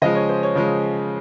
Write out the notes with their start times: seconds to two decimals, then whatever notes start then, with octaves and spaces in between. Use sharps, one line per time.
0.02 C#3 F3 G#3 D#5
0.15 C#5
0.29 C5
0.43 C#5
0.55 C#3 F3 G#3